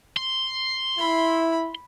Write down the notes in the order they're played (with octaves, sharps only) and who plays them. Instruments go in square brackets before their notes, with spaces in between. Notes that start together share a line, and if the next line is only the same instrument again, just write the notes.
[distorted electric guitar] C6
[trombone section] E4 [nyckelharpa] B5